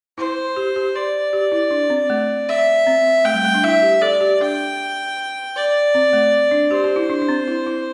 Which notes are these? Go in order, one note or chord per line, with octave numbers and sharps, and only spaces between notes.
E4 C5
G4
G4
D5
G4
E4
D4
C4
A3
E5
C4
A3 G5
G3
A3
D4
E4 E5
G4
A4 D5
G4
D4 G5
D5
C4
A3
D4
G4 C5
G4
E4
D4
D4
C4
E4
E4